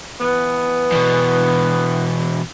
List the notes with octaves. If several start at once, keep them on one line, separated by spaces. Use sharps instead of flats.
E3 B3 B4
E2 B2